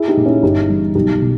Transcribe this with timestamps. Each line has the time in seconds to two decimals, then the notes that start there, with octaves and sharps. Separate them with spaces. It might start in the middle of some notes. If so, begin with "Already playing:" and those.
Already playing: E4 G#4
0.08 D#4 G4
0.17 A#2
0.26 C#4 E4
0.43 G1 D#4 G4
0.69 G2 E3
0.95 B1 D#4 G4
1.22 B2